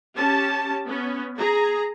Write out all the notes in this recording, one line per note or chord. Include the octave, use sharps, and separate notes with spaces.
C#4 G4 A5
B3 C#4
G#4 A#5